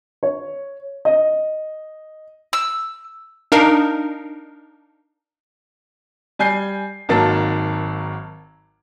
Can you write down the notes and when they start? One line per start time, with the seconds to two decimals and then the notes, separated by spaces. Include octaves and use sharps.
0.23 C#5
1.05 D#5
2.53 E6
3.52 D4 D#4 A#4 F5
6.39 G3 G#5 G6 C7
7.09 G#1 D#3 F#3 A#3 A5 A6